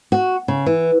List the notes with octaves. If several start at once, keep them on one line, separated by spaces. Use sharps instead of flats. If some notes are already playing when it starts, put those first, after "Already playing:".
F#4
C#3
E3